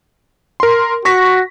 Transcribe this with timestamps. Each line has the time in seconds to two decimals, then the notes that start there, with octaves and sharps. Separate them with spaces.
0.60 A#4 C6
1.05 F#4 C#6 A#6 B6